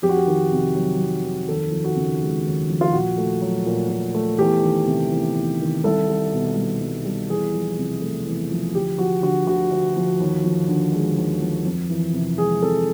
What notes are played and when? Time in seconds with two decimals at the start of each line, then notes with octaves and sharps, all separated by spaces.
0.02 F2 G4
0.09 F#4
0.17 G4
0.26 D#3
0.52 C3
0.75 F#3
0.99 F2
1.23 D#3
1.48 D#2 A4
1.72 F3
1.84 F#4
1.96 C#3
2.21 G#3
2.45 D#2
2.69 F3
2.81 F4
2.93 A#2 F#4
3.18 A3
3.42 F#3
3.66 A#2
3.90 A#2
4.14 A3
4.38 E2 G4
4.62 D#3
4.87 C3
5.11 E2
5.36 E2
5.60 D#3
5.84 C2 A4
6.08 G3
6.33 B2
6.56 C2
6.80 C2
7.04 G3
7.29 E2 G#4
7.54 F3
7.78 C3
8.02 A3
8.26 E2
8.51 F3
8.74 D2 G4
8.98 F3 F#4
9.22 D3 F#4
9.47 D2 F#4
9.71 D2
9.96 F3
10.20 D#2
10.44 F3
10.68 D3
10.92 G#3
11.17 D#2
11.41 F3
11.65 F2
11.89 E3
12.13 C3
12.38 G#3 G#4
12.62 F2 A4